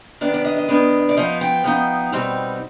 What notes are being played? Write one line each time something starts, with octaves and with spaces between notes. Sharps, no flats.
D#3 B3 D4 D5
D5
D#5
D#5
D#3 B3 D4
D5
F3 B3 D#4 D#5
G5
F3 B3 D#4
B2 G3 C4 D#4